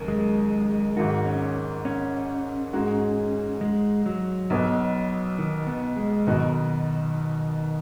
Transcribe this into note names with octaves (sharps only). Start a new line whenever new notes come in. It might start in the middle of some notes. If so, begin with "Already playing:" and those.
Already playing: D#2 C#3 F#3
G#3
G#1 G#2 D#3 F#4
C#4
C#4
G#2 G#3 D#4 F#4
G#3
F#3
B1 B2 B3
D#3
B3
G#3
B1 B2 D#3 B3 D#4 F#4